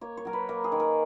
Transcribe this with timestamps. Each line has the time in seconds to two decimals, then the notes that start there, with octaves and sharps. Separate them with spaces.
0.01 A#3 C#5
0.17 C#5
0.25 F#3 A#4
0.33 B4
0.49 A#3 A#4
0.64 G#4
0.72 D#3
0.80 A#4